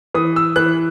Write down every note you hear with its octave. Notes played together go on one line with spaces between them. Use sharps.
E3 D#6
E6
E3 F#6